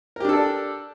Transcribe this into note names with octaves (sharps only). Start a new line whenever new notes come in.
D4 G4 A4 A#4 D5